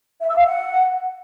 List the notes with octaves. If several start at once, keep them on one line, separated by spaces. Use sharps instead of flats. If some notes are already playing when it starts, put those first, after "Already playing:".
E5
E6
F5
F#5